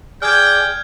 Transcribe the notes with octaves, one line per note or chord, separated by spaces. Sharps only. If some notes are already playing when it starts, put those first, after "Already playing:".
G#4 D5 G5 F6 G6 G#6